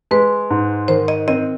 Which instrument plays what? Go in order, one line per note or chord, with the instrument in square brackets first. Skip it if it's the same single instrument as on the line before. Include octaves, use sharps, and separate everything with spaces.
[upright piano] G#3 [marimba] B4
[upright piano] G#2
[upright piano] D#3 [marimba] C5
[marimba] D#5
[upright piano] C4 [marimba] D#5